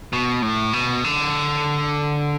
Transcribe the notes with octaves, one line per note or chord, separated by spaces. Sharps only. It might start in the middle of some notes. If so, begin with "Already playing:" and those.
B2
A2
B2
D3